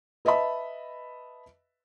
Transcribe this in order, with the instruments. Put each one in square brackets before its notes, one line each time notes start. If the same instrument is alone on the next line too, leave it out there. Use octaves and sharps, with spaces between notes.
[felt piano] B4 D#5 E5 A5 B5